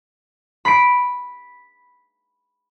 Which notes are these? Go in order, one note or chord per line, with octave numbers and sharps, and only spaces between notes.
B5 B6 C7 D7